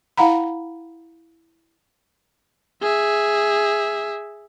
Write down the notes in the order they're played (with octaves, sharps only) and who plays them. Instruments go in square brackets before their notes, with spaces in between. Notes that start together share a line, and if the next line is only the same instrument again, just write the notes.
[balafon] E4 F5 F#5 A#5 B5
[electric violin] G#4 E5